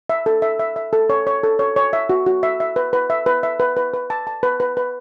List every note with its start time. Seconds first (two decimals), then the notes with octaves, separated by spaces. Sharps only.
0.09 E5
0.26 A4
0.42 E5
0.59 E5
0.76 E5
0.93 A4
1.10 C#5
1.27 C#5
1.43 A4
1.59 C#5
1.76 C#5
1.93 E5
2.10 F#4
2.26 F#4
2.43 E5
2.60 E5
2.76 B4
2.93 B4
3.10 E5
3.26 B4
3.43 E5
3.60 B4
3.77 B4
3.94 B4
4.10 A5
4.27 A5
4.43 B4
4.60 B4
4.77 B4